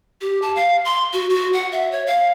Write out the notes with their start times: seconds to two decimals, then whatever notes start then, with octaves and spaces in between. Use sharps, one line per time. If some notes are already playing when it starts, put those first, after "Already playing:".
0.21 G4
0.42 A5
0.56 F5
0.85 C6
1.13 F#4
1.30 F#4
1.53 F#5
1.72 E5
1.92 C#5
2.07 F5